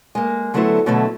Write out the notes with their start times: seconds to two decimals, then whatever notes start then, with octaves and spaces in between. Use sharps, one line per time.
0.15 G#3 A#3
0.54 D3 F#3 A3 B3 E4 C5
0.86 B2 D3 F#3 A3 E4